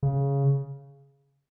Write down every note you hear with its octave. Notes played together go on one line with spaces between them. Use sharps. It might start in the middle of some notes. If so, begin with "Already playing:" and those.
C#3